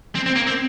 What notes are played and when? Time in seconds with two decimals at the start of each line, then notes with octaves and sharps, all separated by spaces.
0.15 C4
0.26 C4
0.35 A#3
0.47 C4